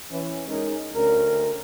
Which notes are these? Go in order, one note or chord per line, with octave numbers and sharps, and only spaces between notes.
E3 C#4
G#3 C#4 D#4 G#4 A#4
D2 C#4 A#4